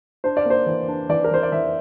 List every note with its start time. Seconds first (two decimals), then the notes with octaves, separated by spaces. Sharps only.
0.24 D4 C5
0.37 D5
0.45 A#3 C5
0.66 E3
0.88 D4
1.09 E3 D5
1.24 A#4
1.31 E3 C5
1.43 D5
1.52 E3 E5